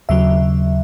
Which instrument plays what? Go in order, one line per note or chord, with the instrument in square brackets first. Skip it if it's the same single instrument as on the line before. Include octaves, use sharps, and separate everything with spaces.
[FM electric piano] D#2 C#3 F#3 E5